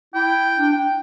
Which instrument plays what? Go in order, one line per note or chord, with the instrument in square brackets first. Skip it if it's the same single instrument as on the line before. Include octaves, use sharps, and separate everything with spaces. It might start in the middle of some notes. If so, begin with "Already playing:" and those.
[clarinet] E4 [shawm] G5
[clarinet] D4
G5